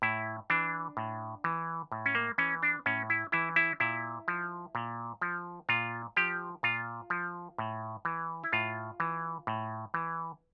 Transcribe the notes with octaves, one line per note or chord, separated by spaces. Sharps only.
A2 E4
E3 D4
A2
E3
A2
C#4
A#3
E3 C#4
D4
A2 C#4
E4
E3 E4
E4
A#2 E4
F3
A#2
F3
A#2 F4
F3 G4
A#2 F4
F3
A2
E3
E4
A2 F4
E3
A2
E3